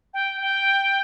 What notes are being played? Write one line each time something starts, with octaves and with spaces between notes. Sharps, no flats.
G5
G5